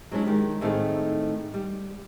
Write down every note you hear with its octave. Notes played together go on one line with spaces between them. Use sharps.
F#3 G#3 C#4 D4 E4
D#3 G#3 G4
A2 D#3 A3 C4 E4 G#4
G3